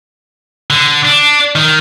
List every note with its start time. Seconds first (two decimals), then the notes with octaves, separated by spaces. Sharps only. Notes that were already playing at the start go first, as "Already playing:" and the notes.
0.70 D3
1.05 D4
1.55 D#3